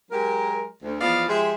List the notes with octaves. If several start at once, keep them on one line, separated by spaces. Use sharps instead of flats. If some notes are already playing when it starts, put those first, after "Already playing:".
F#3 G#3 G4 A#4
D2
E2 F3 B3 D5 D#5 F5
F3 G#3 G4 G#4 C5 E5